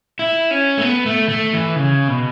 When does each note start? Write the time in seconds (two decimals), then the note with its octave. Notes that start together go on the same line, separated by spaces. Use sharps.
0.19 E4
0.51 C#4
0.78 A3
0.82 B3
1.06 A3
1.29 A3
1.53 E3
1.76 C#3
2.08 B2